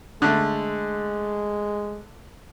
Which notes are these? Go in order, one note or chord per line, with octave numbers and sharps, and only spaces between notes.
D3 G#3 A3